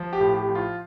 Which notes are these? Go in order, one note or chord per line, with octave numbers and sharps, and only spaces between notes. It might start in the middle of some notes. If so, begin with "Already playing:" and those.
Already playing: F3
G4
A2
G4
F3
F4